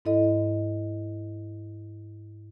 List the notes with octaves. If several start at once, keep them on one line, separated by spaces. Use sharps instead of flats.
G#2 E4 A4 D#5